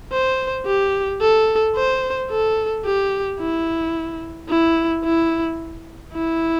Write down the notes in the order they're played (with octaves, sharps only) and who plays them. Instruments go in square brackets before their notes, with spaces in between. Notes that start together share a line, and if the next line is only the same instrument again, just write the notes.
[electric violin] C5
G4
A4
C5
A4
G4
E4
E4
E4
E4